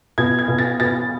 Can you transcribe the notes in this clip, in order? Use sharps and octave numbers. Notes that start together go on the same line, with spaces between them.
B2 G#6
G#6
B2
A6
B2 A6